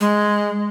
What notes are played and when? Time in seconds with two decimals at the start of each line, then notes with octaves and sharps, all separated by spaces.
0.01 G#3